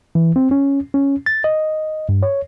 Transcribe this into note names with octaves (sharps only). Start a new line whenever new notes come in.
E3
C4
C#4
C#4
A6
D#5
G2
C#5